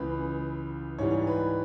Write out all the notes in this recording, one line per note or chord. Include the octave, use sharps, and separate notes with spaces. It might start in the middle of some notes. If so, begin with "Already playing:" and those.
Already playing: C#2 C#3 E3 B4
G#2 E3 G3 C#5
B4